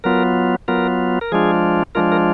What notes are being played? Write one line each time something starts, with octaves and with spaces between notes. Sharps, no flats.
F#3 B3 F4 A#4
F#3 B3 F4 A#4
A#4
F3 G#3 D4 F4 G#4
F3 G#3 D4 F4 A#4
A#4